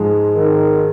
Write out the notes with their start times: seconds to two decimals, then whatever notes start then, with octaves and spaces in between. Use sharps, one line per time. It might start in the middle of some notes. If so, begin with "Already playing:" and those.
Already playing: G#2 F3 G#3
0.35 D#3